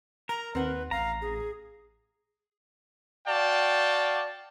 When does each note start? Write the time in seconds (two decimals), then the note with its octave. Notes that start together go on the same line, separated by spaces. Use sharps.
0.29 A#4 A#5
0.55 D#2 C4 B4 F#5
0.91 A1 F5 A#5
1.22 G#4
3.27 F#4 D5 F5 G5 A5